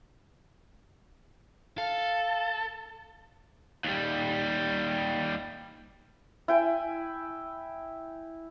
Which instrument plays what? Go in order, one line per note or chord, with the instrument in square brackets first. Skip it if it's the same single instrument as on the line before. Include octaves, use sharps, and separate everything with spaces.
[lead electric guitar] A4 [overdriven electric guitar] F5
[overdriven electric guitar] D#2 G3
[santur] E4 G5 G#5